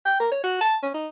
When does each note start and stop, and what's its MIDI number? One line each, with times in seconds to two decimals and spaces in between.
0.05 0.20 79
0.20 0.27 70
0.31 0.40 73
0.44 0.60 66
0.61 0.76 81
0.83 0.91 61
0.94 1.08 63